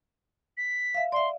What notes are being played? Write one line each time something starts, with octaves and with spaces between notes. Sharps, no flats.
B6
E5 F5
D5 E5 C6